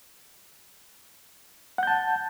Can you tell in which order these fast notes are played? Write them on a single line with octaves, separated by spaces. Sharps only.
F#5 G6 A5